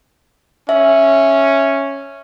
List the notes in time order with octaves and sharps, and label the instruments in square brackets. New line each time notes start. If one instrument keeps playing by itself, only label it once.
[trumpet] C#4 [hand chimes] E5